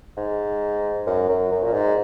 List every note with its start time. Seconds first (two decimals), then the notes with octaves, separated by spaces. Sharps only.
0.17 G#2
1.07 F#2
1.29 F#2
1.52 F#2
1.63 A#2
1.74 G#2